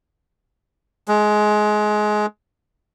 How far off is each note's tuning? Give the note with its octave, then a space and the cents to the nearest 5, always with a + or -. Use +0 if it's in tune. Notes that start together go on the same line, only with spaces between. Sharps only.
G#3 +20